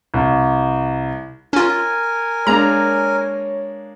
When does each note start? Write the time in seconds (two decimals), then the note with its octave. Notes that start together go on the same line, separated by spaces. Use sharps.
0.14 C2
1.53 C#4 F4 A#4 G#5
2.47 G#3 A#3 D4 C#5 A#5